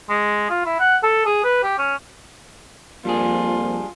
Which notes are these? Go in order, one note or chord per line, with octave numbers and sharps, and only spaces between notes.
G#3
F4
E4
F#5
A4
G#4
B4
G4
C#4
F2 F3 G3 A#3 D4 F4 G#4